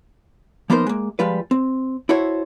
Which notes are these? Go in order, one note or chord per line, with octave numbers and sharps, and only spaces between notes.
F3 A#3 B3 D#4 A#4 C5
G#3 A#3
F3 G3 G#3 F4 B4
C4
E4 F#4 A4 C5 C#5